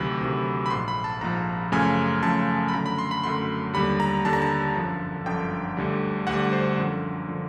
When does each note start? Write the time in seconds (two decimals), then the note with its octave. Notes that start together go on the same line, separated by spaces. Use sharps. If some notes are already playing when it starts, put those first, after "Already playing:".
Already playing: D2 C3 D#3 F#3 B5
0.20 D2 C3 D#3 F#3
0.66 B5
0.70 A#1 G#2 F3 C6
0.88 B5
1.04 A5
1.21 A#1 G#2 F3 A#5
1.72 F#2 C#3 F3 A3 G#5
2.22 F#2 C#3 F3 A3 A5
2.68 B5
2.73 F#2 D3 F#3 A3 A#5
2.86 B5
2.98 C6
3.11 B5
3.23 F#2 D3 F#3 A3 C6
3.74 D#2 D3 G3 B5
4.00 A#5
4.25 D#2 D3 G3 A5
4.33 A#5
4.42 A5
4.75 G1 F#2 D3 F3
5.26 G1 F#2 D3 F3 G5
5.77 D2 D3 G3
6.27 D2 D3 G3 F#5
6.53 C5
6.78 F#2 D3 F3
7.28 D3 F3